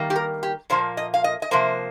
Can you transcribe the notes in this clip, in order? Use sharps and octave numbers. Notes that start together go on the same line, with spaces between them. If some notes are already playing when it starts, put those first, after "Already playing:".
Already playing: D#3 G3 A#3
G4
A#4
G4
A#2 F3 A#3 C5
D#5
F5
D#5
D#5
C3 F3 A#3 C5